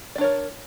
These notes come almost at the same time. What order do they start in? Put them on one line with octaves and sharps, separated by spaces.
D5 D4 C#5 A#4